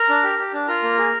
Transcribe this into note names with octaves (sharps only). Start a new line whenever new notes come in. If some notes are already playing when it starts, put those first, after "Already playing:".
Already playing: A#4 A#5
D4
G4
G4
D4
F4 A#4 A#5
A#3
G#4